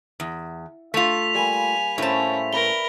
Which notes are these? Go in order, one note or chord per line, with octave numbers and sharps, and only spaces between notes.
E2
A3 F4 B6 F7
G3 A#3 G#5 B5
A2 C#4 C5 E5 A5
A#4 B4 B5 C#6 G7